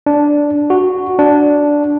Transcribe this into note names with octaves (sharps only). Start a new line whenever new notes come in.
D4
F#4
D4